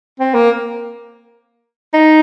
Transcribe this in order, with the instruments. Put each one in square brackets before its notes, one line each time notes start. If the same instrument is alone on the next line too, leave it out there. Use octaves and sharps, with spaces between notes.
[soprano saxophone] C4
A#3
D#4